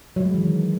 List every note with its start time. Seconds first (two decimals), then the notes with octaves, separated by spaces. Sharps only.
0.16 F#3
0.25 G#3
0.34 E3
0.43 D#3